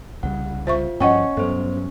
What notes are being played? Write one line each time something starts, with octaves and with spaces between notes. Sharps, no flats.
C2 C#3 G3 F#5
F4 C5 E5 C#6
G2 F3 C#4 C#5 D#5 F#5 G5 C#6
G2 F#3 B3 A4 C5